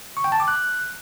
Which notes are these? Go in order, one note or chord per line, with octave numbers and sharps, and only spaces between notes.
C#6
G5
A5
D6
F#6